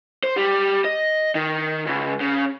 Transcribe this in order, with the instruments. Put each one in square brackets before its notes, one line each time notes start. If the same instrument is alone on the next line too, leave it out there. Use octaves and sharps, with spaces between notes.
[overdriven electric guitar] C5
G3
D#5
D#3
C#2
C#3